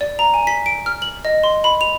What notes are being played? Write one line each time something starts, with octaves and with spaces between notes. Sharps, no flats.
D5
A#5
G#5
B6
D7
F6
F#7
D#5
C6
B5
F7